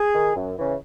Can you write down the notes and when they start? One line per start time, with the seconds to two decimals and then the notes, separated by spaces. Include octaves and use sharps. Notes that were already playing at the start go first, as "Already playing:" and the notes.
Already playing: G#4
0.15 D#3
0.36 F#2
0.57 C#3 E3